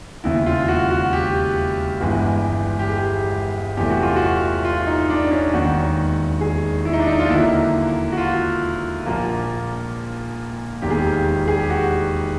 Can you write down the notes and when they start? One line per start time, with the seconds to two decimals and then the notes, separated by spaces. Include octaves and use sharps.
0.24 E1 D#2 C#3 E4
0.46 F4
0.68 F#4
0.90 F#4
1.13 G4
2.00 G1 G2 E3 G#3
2.79 G4
2.88 G#4
3.77 E2 C3 E3 A3 G4
3.90 F#4
4.03 F4
4.16 F#4
4.65 F4
4.87 D#4
5.09 D4
5.31 C#4
5.53 E1 D#2 D#3 F#4
6.41 G#4
6.85 E4
6.93 D#4
7.00 D4
7.07 D#4
7.19 F4
7.29 D#2 D3 F#3 A#3 E4
8.12 F#4
8.17 F4
9.06 A#1 A#2 F3 A#3
10.82 E1 D#2 D#3 G4
10.90 G#4
10.98 G4
11.48 G#4
11.59 G4
11.70 F#4